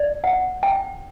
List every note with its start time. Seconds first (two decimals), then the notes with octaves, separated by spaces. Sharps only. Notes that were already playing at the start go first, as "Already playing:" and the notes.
Already playing: D5
0.24 F#5
0.63 G5